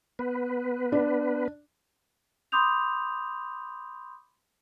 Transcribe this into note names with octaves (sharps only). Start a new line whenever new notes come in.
B3 B4
D4
B5 C6 D6 D#6 G6 F7